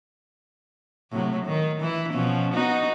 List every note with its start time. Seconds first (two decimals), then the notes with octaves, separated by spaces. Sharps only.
1.12 A2 C3 F#3
1.45 D#3
1.80 E3 E4
2.13 B2 F3 C#4
2.53 B3 D#4 F#4